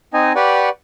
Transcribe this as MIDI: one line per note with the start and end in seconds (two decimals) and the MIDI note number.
0.14 0.33 60
0.14 0.33 63
0.14 0.33 75
0.14 0.33 80
0.36 0.69 67
0.36 0.69 71
0.36 0.69 74
0.36 0.69 78
0.36 0.69 85